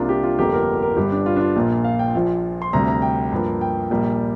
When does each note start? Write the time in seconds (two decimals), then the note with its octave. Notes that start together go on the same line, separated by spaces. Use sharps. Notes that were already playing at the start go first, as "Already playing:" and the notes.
Already playing: C2 C3 A#3 D4 F4
0.09 G4
0.23 F4
0.39 G1 F2 D3 A#3 G4
0.53 A#4
0.82 A#4
0.97 G1 G2 G3 G4
1.12 D4
1.26 F4
1.36 D4
1.41 F4
1.56 A#1 A#2 A#3
1.84 F5
1.99 G5
2.14 A#1 A#2 F3
2.62 C6
2.73 D2 C3 G3 A#5
2.88 A#5
3.02 G5
3.32 G2 F3 A#3
3.61 G5
3.90 A#1 A#2 G3 A#3